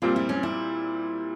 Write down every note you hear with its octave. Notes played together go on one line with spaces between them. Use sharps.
A#2 G3 C4 F4
E4
C#4
E4